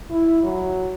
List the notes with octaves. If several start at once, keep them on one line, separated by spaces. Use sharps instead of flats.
E4
F#3